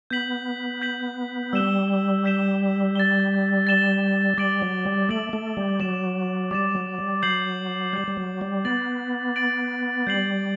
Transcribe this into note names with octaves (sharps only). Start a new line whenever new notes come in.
B3 G6 B6 F#7
G6 B6 F#7
G3 E6 G6 B6 E7 G7
E6 G6 B6 E7 G7
A6 E7 G7
A6 E7 G7
G3 D6 A6 D7 F#7
F#3
G3
A3 D6 A6 D7 F#7
A3
G3
F#3 D6 A6 E7
G3 D6 A6 E7
F#3
G3
F#3 G6 C7 F#7
G3 G6 C7 F#7
G3
F#3
G3
B3 A6 D7 F#7
A6 D7 F#7
G3 G6 C7 F#7